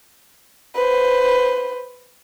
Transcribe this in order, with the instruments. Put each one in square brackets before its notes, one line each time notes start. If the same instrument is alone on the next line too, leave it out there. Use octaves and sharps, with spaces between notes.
[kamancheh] B4 C5